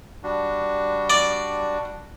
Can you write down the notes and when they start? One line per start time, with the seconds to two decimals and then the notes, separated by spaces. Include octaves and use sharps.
0.24 G3 D4 F#4
1.10 D5